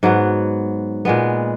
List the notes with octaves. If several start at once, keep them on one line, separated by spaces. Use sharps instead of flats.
G#2 F#3 B3
A#2 G#3 B3